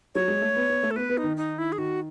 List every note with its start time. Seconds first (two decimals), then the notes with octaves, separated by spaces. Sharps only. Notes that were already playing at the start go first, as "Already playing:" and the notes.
0.15 F#3 C#5
0.28 G#3
0.42 A3
0.56 B3
0.69 B3
0.83 A3
0.91 A4
0.96 B3 B4
1.09 B3
1.17 D#4
1.23 D#3
1.37 D#4
1.58 E4
1.72 G#4
1.78 D#3 F#4